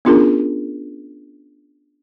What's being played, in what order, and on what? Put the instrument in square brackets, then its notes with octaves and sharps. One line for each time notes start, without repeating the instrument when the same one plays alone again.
[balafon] B3 C#4 D4 F4 G#4 A#4